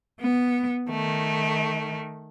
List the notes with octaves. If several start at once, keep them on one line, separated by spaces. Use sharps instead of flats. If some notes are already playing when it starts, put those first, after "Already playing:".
B3
D#3 A3